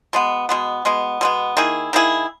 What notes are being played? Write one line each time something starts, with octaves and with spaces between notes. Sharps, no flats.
B2 G#3 B3
B2 G#3 B3
B2 G#3 B3
B2 G#3 B3
D#3 A#3 E4 G#4
D#3 A#3 E4 G#4